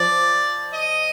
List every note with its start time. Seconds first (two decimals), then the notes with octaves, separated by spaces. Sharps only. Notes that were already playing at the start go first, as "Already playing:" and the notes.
Already playing: F3 D5
0.73 D#5